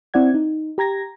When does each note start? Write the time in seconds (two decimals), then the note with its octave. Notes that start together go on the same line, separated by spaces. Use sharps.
0.14 C4 E4 D5 F#5 G#6
0.34 D#4
0.78 G4 A#5 G#6 A#6